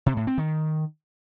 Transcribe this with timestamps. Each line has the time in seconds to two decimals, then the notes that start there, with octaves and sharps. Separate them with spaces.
0.06 C3
0.17 A2
0.27 C4
0.38 D#3